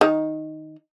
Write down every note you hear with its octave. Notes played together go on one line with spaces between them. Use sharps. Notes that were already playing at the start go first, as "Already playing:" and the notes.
D#3 D#4